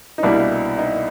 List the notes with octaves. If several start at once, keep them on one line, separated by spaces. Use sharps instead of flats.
D#4
C2 B2 G3 A#3 D4 E4
D#4